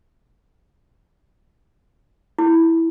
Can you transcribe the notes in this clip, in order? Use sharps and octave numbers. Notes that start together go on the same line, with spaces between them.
E4